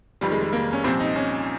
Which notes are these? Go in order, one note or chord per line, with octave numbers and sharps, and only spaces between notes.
F1 F2 D#3 G3
G#3
G#3
A#3
C#4
C2 A#2 F3 C4
D#4
C#4